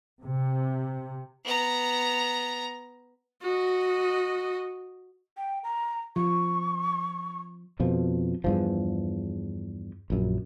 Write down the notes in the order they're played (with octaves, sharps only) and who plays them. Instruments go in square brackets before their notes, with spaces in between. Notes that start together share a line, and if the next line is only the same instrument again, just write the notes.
[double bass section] C3
[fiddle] B3 A#5
[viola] F#4 D#5
[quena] G5
A#5
[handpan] F3 [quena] C#6
[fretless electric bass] F2 B2 F3
E2 G2 F3
A#1 F#2